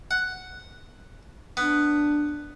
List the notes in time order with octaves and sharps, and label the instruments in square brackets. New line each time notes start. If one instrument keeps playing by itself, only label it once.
[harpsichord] F#5
[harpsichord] B3 [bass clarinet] D4